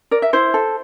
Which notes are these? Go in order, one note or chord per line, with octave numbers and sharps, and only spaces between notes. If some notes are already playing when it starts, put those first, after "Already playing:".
A#4 D5
E5
E4 C5
A4